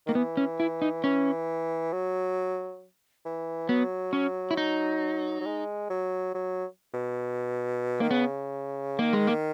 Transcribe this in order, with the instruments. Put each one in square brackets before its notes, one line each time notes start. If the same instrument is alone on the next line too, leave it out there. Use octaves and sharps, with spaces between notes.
[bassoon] D#3 [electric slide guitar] A#3
[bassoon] E3 [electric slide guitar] B3
[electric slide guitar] C#4
E4
D#4
[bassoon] E3 [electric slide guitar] C#4
[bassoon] F#3
E3
[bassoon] F#3 [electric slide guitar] B3
[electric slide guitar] C#4
E4
D#4
[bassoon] F#3
G#3
F#3
F#3
B2
[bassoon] D#3 [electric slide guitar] A#3
[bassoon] C#3 [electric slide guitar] B3
[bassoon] D#3 [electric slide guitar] A#3
[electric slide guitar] G#3
A#3